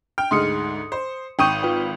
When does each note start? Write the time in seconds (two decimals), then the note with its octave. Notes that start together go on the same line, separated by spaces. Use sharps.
0.18 G5 F6
0.31 D2 G#2 G#3 C6 D#6 C#7
0.92 C5
1.39 G#1 G5 C#6 D#6 G6 D#7
1.63 F4 B4 G5